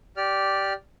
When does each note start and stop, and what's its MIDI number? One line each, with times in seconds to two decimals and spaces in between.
0.17 0.73 67
0.17 0.73 74
0.17 0.73 89